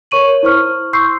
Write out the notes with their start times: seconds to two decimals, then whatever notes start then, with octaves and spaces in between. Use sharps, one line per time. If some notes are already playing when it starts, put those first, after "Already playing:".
0.11 A#4 C#5 C#6 D#7 F#7
0.43 E4 C5 C#6 F6
0.93 C6 C#6 E6 G6 C7